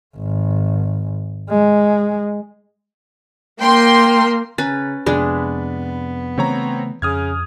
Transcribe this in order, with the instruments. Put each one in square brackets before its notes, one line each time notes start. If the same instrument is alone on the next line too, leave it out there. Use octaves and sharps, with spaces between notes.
[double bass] G#1
G#3
[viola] A#3 [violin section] G5 C6
[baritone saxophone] C#3 [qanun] C#4 B4 [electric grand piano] A#5 A6
[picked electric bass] F2 C3 [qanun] G#3 D4 [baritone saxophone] B3 [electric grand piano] B5
[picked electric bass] C#3 E3 A3 [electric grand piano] C4 C#5 A#5
[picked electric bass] F2 [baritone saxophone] C#3 [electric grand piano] D#6 F6 G#6